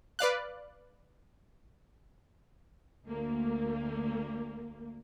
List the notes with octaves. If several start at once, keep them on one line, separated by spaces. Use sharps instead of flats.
B4 D5 F5 F#6
D2 A#3